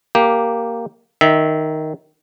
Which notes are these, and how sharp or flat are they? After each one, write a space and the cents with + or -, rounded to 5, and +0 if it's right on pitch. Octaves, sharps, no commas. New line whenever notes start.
A#3 +0 G4 +0
D#3 +0 E5 -15